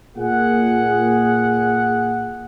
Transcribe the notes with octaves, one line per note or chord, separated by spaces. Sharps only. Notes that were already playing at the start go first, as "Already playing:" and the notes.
A#2 G#4 F#5